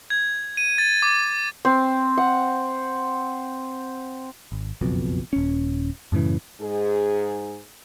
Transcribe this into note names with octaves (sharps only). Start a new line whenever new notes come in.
G#6
D#7
A6
D6
C4
F#5
G#1
F#1 B1 F2 B2
D#1 C#4
F#2 A2 C#3 E3
G#2 G#4